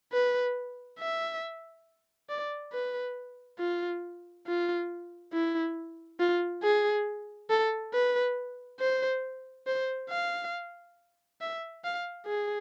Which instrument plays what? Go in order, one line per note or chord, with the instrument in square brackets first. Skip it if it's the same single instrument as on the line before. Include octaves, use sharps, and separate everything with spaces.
[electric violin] B4
E5
D5
B4
F4
F4
E4
F4
G#4
A4
B4
C5
C5
F5
E5
F5
G#4